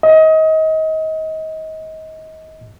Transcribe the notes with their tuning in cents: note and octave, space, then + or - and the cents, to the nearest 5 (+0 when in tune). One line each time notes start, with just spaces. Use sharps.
D#5 +30